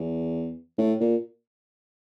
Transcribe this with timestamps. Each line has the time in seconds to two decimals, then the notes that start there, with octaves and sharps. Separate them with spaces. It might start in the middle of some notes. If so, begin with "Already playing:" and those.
Already playing: E2
0.78 A2
1.00 A#2